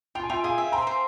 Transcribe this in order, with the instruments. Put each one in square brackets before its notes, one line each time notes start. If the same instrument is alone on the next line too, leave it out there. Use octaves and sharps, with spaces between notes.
[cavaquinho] F4 [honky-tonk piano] G5
[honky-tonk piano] G#5
[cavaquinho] F4 [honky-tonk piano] E5 G5
[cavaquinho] G#4 [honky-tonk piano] F5 G#5
[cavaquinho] E5
[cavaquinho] C5 [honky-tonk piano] G5 A#5
[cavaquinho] C5